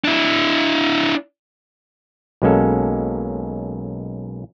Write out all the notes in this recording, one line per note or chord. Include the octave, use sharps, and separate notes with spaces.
D4 E4
B1 F#3 G#3 A#3 C#4 A4